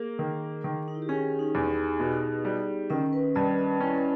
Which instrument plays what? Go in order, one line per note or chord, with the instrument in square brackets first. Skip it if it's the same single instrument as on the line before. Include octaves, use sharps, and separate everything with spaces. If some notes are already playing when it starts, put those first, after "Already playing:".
Already playing: [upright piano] A#3 [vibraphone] G#4 A#4
[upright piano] D#3
D#3
[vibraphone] D#4
E4
G4
[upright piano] C#4 [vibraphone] G#4
[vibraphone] D#4
[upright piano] E2
[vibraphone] B3
[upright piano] B2
G3
[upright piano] D#3 [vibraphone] C#4
[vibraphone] B4
[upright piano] G2 [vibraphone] D#5
[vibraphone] D#5
[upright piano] C#4 [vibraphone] E4